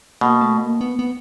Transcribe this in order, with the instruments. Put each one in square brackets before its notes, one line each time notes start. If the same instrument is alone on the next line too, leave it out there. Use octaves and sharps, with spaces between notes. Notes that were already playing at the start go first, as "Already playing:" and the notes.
[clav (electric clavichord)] B2 [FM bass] A#3
[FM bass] A3
A#3
B3
B3